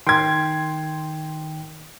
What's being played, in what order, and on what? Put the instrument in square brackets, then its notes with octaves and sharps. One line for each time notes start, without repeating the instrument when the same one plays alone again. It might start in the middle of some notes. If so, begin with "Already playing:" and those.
[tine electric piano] D#3 G5 [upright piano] C6 G#6